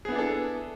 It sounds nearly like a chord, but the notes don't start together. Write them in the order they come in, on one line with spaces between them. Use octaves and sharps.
G#4 B3 E4 D4 A4